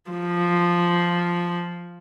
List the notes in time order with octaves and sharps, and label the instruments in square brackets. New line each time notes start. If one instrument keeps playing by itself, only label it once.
[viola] F3